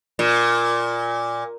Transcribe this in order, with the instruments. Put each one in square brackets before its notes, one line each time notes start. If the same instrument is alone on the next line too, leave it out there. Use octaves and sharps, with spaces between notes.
[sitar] A#2